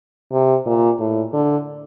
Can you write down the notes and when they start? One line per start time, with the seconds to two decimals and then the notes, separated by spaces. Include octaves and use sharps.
0.31 C3
0.66 A#2
1.00 A2
1.33 D3